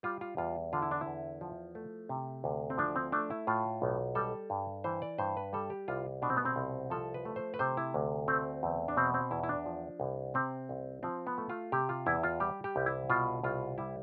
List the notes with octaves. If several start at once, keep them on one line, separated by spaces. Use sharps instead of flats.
G3 F4
F4
E2 F4
D3 F4
E4
D4
E4
E2
F3
A3
C3
D2
C4
F3 D4
C4
A3 D4
E4
A2 F4
B1
G3 A4
G2
E3 C5
D5
G2 C5
B4
G3 A4
G4
C2 F4
B2 D4
C4
B3
C4
C2
F3 A4
B4
A3
C5
B4
C3 C5
E4
D2
A3 C4
E2
D4
B2 C4
C4
E2 E4
E4
D4
F3
C2
C3 C4
C2
F3 C4
B3
A3
F4
C3 G4
F4
E2 E4
F4
G3 G4
G4
C2
E4
B2 F4
C2 F4
G3 E4